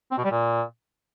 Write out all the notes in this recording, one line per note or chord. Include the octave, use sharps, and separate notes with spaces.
C4
B2
G3
A#2